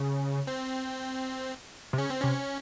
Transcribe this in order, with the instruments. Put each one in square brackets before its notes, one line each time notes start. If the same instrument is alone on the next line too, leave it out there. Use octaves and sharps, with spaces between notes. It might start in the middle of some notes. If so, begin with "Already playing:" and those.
Already playing: [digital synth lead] C#3
[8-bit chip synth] C4
[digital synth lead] C3
[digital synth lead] C#3 [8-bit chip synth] C#4
[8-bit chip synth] C4
[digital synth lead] C3 [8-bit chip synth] C#4